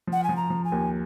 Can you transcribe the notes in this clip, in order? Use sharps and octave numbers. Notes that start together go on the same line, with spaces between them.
F3
F#5
G#5
F3
A#5
F3
G#5
D#2